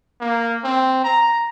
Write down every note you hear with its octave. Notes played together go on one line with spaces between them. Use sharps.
A#3
C4
A#5